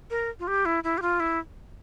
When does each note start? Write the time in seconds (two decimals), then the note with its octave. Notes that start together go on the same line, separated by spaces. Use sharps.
0.10 A#4
0.39 F4
0.47 G4
0.65 E4
0.84 E4
0.98 G4
1.02 F4
1.20 E4